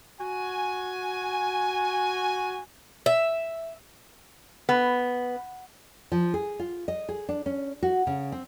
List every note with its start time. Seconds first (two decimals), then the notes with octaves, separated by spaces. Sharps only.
0.21 F#4 G#5
3.06 E5
4.69 B3
6.12 F3
6.34 G#4
6.59 F4
6.88 D#5
7.09 G#4
7.29 D4
7.46 C#4
7.83 F#4
8.07 C#3
8.32 C4